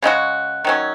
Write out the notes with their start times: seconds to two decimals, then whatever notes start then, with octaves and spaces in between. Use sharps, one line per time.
0.02 C#3 G#3 D#4 F#4
0.65 D#3 F#3 C#4